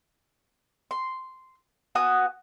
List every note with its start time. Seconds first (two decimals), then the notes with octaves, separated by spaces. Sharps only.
0.91 C6
1.95 B3 F#4 G#5 D#6